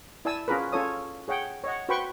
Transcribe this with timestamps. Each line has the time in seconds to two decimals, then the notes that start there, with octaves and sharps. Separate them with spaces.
0.25 E4 D5 G#5 A5 E6
0.48 C#4 F4 G#4 A#4 B4
0.72 C#4 F4 A4 C#5 D#6
1.28 G#4 C#5 F#5 G5
1.64 C#5 D#5 F#5
1.89 F#4 B4 C5 G5 B5 C#6